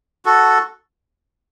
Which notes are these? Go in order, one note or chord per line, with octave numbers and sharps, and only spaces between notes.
F#4 A4